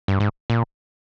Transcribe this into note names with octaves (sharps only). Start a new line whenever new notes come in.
G2
G#2
A#2